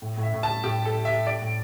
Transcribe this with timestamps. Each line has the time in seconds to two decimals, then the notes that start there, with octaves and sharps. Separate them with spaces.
0.02 A2
0.17 A2
0.23 E5
0.33 A2
0.43 A5
0.49 G3
0.64 A2 G4
0.79 G3
0.85 A4
0.95 G3
1.05 E5
1.10 G3
1.26 G3 D5
1.42 A2